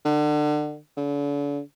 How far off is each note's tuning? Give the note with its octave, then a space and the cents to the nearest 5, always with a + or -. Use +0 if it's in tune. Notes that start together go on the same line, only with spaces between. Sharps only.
D3 +30
D3 -40